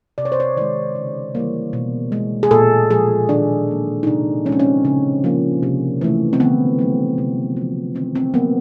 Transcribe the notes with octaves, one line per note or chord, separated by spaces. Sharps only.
C3 D5
C#5
C5
C#5
D#3 G#3 D5
C#3
E3 G3 A#3
B2
G#3
G#4
A#2 A4
F3 G#3 G#4
D#3 D4
F#3 A#3
D#4
C3 D4
F3 G#3 C4 C#4
C#4
C#3
F3 A#3
C3
E3 A3
C4
D3 B3
F#3 A3
C3
F3 A3
D#3 C4
C4
F#3 A#3 B3